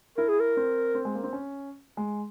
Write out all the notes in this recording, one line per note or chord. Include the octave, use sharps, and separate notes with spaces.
E4 A#4
G#4
A#4
C4
C4
G#3
A#3
C4
C#4
G#3